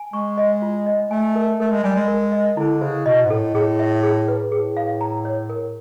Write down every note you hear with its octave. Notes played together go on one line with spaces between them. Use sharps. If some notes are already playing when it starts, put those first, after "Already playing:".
Already playing: G#5
G#3 C#6
D#5
F4
D#5
A3 G#5
A#4
A3 A#4
G#3
G3 G#5
G#3
A#4
D#5
D3 E4
C#3 C5
B2 D#5
G#2
A2 A4
A2 G#4
E5
G#4
B4
A2 G#4
F5
A#5
C#5
A#4